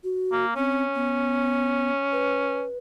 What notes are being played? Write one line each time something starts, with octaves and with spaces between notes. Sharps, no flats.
F#4
A#3
C4 C#4
B3
B4